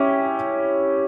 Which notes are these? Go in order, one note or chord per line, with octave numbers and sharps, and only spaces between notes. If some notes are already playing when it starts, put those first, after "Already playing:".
Already playing: C#4 E4 G4